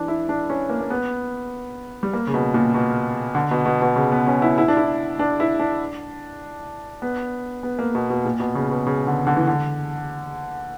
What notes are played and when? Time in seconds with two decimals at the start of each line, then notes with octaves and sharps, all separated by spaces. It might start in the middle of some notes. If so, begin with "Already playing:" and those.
Already playing: E3 D4
0.08 E4
0.29 D4
0.50 C#4
0.70 A#3
0.80 A#3
0.90 B3
2.03 G3
2.13 A#3
2.27 C#3
2.34 B2
2.54 A#2
2.74 B2
3.35 D3
3.51 B2
3.66 B2
3.82 B2
3.96 C#3
4.12 B3
4.27 C#4
4.42 E4
4.58 E4
4.68 D4
4.77 E4
5.19 D4
5.40 E4
5.59 D4
7.02 B3
7.63 B3
7.79 A#3
7.95 B2
8.10 B2
8.25 A#2
8.40 B2
8.55 C#3
8.71 B2
8.87 C#3
9.07 D3
9.27 D3
9.37 E3
9.47 D3